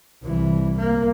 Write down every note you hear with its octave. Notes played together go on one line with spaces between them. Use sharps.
C2 E3
A#3